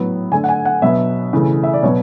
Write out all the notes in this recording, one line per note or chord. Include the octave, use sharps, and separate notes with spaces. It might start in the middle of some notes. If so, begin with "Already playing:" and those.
Already playing: A2 F#3 B3
D3 A3 G#5
F#5
G#5
F#5
B2 F#3 B3 E5
C#3 E3 A3
E5
D5
B2 F#3 B3 C#5